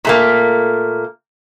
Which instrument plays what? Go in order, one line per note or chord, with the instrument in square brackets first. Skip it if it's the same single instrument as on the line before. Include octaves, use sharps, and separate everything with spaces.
[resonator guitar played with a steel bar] A#2 A3 A#3